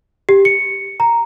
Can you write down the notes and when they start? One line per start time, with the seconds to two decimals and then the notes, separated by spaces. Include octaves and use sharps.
0.29 G4
0.45 C#7
1.00 A#5